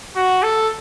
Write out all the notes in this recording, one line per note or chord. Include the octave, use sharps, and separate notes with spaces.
F#4
A4